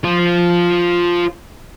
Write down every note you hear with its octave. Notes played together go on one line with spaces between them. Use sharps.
F4 C5